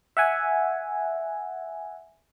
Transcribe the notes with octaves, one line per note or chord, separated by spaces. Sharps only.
E5 F#5 G#5